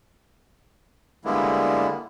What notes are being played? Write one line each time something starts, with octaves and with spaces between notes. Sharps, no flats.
D3 G3 G#3 A#3 B3 E4